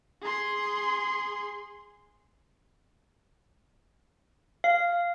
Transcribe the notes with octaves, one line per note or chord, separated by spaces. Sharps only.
G#4 C6
F5